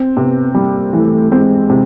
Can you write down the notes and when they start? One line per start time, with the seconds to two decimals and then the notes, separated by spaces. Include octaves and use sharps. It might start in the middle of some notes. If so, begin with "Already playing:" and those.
Already playing: C4
0.17 C3 B3
0.54 G3 A#3
0.93 E3 A3
1.31 G#3 C4
1.70 C3